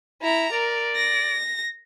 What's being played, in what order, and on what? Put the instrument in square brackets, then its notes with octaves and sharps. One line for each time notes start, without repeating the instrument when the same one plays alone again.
[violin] E4 A#5
[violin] A#4 [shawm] D5
[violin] A#6